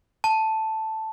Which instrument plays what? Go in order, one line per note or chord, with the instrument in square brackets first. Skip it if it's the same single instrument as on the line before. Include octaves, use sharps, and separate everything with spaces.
[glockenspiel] A5